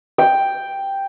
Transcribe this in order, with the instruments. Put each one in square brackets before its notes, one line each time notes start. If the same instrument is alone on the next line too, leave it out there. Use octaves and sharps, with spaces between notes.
[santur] G5